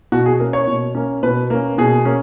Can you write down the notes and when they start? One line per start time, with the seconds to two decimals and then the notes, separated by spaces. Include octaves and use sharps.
0.12 B2 F#4
0.26 G#4
0.40 A#3 C#4 A#4
0.53 C#5
0.67 B2
0.95 A#3 C#4
1.23 B2 B4
1.50 A#3 C#4
1.78 B2 G#4
2.05 A#3 C#4